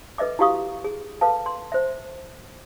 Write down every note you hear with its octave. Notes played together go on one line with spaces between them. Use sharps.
A4 B4 D#5 E5 D6
E4 F#4 G4 F5 C#6 D#6
G#4
A4 B4 F5 A5
C6
C5 E5